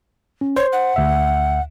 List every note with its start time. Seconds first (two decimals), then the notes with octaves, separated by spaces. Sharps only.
0.41 C#4
0.56 C5 C#5
0.73 F#5
0.96 D2 E5